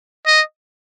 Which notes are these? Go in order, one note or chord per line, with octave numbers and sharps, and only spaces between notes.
D#5